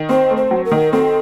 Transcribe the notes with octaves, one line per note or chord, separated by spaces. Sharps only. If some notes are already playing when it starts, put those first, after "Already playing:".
Already playing: D#3
C4 C5
A3
C5
F#3
A#4
D#3
C4 A4